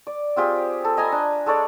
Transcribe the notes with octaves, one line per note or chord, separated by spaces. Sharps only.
D5
C4 F4 G4 G#4
A4
D#5 G#5 A#5 B5
D4
G#3 A4 C#5 D5